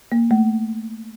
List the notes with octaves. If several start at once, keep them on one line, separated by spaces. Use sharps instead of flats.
A#3
A3